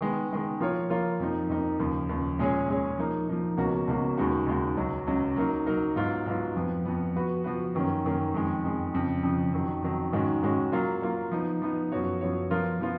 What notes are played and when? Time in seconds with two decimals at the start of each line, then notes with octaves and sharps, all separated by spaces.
0.01 D#3 G#3 B3
0.31 D#3 G#3 B3
0.60 F3 A#3 F4 A#4 C#5
0.90 F3 A#3 F4 A#4 C#5
1.19 F2 F3 A#3 D#4
1.49 F2 F3 A#3 D#4
1.79 D#2 C#3 F3
2.09 D#2 C#3 F3
2.39 A#2 G#3 C#4 G#4 C#5
2.68 A#2 G#3 C#4 G#4 C#5
2.98 F3 A#3 D#4
3.28 F3 A#3 D#4
3.57 C#2 B2 A#3 C#4 F#4
3.88 C#2 B2 A#3 C#4 F#4
4.18 D#2 C#3 G#3 D#4 F#4
4.47 D#2 C#3 G#3 D#4 F#4
4.77 C#2 C#3 F#3 C#4
5.07 C#2 C#3 F#3 C#4
5.36 F#3 A#3 D#4 A#4
5.66 F#3 A#3 D#4 A#4
5.96 G#2 F#3 B3 F4
6.26 G#2 F#3 B3 F4
6.55 F2 F3 B3
6.85 F2 F3 B3
7.15 F3 B3 F#4 B4
7.44 F3 B3 F#4 B4
7.75 F#2 D#3 A#3 C#4
8.04 F#2 D#3 A#3 C#4
8.34 F2 D#3 G#3
8.64 F2 D#3 G#3
8.94 F2 C#3 F3
9.23 F2 C#3 F3
9.53 F2 D#3 F#3
9.82 F2 D#3 F#3
10.13 G#2 D#3 G#3 C#4 F#4
10.42 G#2 D#3 G#3 C#4 F#4
10.72 F#3 A#3 F4
11.02 F#3 A#3 F4
11.31 F3 B3 D#4
11.62 F3 B3 D#4
11.92 F#2 F3 B3 F#4 C#5
12.21 F#2 F3 B3 F#4 C#5
12.50 F3 B3 F4 A#4
12.81 F3 B3 F4